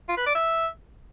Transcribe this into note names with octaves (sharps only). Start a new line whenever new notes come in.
F4
B4
D5
E5